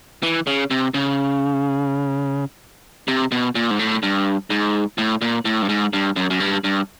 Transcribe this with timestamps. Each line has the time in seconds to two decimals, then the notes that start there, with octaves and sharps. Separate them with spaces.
0.23 E3
0.47 C#3
0.71 C3
0.94 C#3
3.08 C3
3.32 B2
3.55 A#2
3.71 G#2
3.79 A2
4.03 G2
4.50 G#2
4.98 A2
5.21 A#2
5.45 A2
5.62 G2
5.69 G#2
5.93 G2
6.16 F#2
6.30 F#2
6.40 G2
6.64 G2